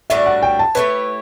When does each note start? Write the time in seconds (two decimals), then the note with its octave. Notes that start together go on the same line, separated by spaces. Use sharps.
0.10 A2 G3 D4 F#4 E5
0.26 F#5
0.43 G5
0.59 A5
0.75 A3 E4 G4 B4 C#5